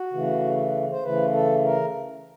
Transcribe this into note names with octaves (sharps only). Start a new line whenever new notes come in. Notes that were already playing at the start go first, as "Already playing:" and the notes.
Already playing: F#4
C#3 E3 A3
C5
C#3 E3 A3 B4
A4
A#4